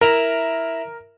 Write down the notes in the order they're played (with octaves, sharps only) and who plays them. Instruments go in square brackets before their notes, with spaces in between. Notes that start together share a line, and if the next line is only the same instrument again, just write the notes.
[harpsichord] E4 A#5 [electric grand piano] A#4